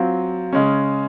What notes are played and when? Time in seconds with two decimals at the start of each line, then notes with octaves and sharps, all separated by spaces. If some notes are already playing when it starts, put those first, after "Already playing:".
Already playing: F#3 C4 F4
0.53 C#3 G#3 C#4